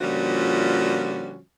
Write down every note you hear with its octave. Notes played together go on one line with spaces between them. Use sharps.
A#2 D3 F3 G3 C#4 F#4